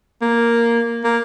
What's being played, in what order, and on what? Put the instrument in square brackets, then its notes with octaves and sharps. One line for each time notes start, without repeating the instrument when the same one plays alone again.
[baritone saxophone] A#3
A#3